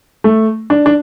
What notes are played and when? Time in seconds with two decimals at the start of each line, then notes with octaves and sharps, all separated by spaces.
0.24 A3
0.70 D4
0.86 D4